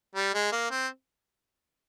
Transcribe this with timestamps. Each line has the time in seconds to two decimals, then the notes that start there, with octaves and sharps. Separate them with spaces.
0.15 G3
0.34 G#3
0.52 A#3
0.71 C4